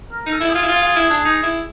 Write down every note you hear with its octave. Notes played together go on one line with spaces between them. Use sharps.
A#4
D#4 A4
E4
G#4
F4
E4
F4
F4
E4
D4
D#4
E4